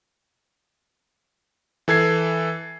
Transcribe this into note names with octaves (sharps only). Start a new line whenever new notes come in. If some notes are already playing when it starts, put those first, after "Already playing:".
E3 A4 G#6 C7